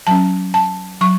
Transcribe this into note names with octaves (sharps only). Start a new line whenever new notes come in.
F#3 C#4 A5
A5
F#3 C#6